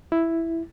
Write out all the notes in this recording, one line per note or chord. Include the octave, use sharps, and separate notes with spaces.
E4